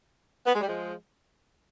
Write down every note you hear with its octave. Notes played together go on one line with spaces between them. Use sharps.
B3
G#3
G3
F3 G#3